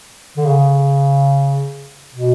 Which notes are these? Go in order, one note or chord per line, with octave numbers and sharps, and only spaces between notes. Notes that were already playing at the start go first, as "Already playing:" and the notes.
D3
C#3
B2